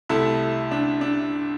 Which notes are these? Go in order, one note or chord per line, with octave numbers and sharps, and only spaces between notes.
C2 C3 A3 E4 A4
D4
D4